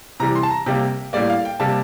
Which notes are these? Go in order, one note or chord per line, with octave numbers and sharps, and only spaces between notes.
C3 E3 G3 A#5
C6
A5
A#5
C3 G3 A#3 G5
A2 G3 A#3 D5
F5
G5
C3 G3 A#3 A5